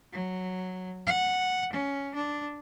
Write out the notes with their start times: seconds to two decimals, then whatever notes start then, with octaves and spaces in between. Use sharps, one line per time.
0.13 F#3
1.07 F#5
1.73 C#4
2.15 D4